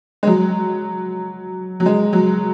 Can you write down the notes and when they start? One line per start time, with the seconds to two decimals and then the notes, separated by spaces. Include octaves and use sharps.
0.23 G#3
0.27 F#3
1.80 F#3
1.86 G#3
2.13 F#3